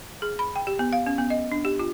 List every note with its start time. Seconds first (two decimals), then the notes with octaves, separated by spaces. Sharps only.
0.22 G#4
0.39 B5
0.56 G5
0.67 G4
0.79 B3
0.93 F5
1.06 C#4
1.18 B3
1.30 D#5
1.52 D4
1.65 G4
1.79 F4